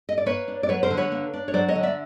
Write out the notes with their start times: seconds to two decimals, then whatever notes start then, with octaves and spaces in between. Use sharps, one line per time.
0.09 D#5
0.18 D5
0.26 A#3 B4 C#5
0.48 D4
0.63 D5
0.69 F#3 B4 C#5
0.83 A#4 C5
0.90 D3
0.97 B4 C#5
1.12 A#3
1.34 D4
1.48 C#5
1.54 F#3 C5 D5
1.68 C#5 D#5
1.75 D3
1.83 D5 E5